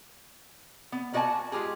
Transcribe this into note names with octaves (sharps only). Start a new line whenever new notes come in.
B3
A#3 F#4 D5 D#5 G#5 A5
G#3 F4 G4 G#4